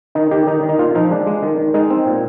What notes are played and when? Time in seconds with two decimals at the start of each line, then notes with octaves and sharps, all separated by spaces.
0.15 D#3 D#4
0.31 D#3 G4
0.47 D#3 D#4
0.63 D#3
0.69 D#4
0.78 A#2 F4
0.95 F3 D#4
1.10 G#3 D4
1.27 G#3
1.43 D#3
1.58 D#3
1.74 G#3 D#4
1.90 C4
2.06 A#2